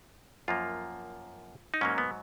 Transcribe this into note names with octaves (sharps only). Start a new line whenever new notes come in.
F#2 F3 A#3 F4
D#4
G#2 F#3 A#3 C#4
B3